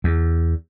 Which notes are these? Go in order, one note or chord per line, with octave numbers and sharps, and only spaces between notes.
E2